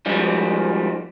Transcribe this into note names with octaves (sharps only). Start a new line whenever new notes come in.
G#2 F3 G3